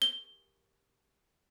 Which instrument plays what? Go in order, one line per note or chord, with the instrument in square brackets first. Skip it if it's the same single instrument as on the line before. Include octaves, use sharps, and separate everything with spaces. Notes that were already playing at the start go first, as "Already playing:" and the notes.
[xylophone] G7